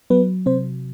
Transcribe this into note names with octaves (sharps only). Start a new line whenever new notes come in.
F#3 B3 B4
C3 C4 C5